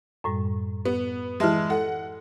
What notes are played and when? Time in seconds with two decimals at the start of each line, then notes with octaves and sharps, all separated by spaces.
0.24 F#2 A2 G3
0.85 B3
1.40 E3 G#3 E5 A5 F6
1.70 A4 F#5